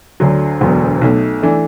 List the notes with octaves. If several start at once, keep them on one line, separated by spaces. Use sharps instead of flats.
D2 D3 F#3
E1 D2 D3 F#3 B3
B1 B2 A3
E3 A3 D4